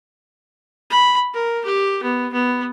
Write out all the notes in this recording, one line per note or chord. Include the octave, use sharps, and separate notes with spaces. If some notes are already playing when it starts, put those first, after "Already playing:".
B5
A#4
G4
B3
B3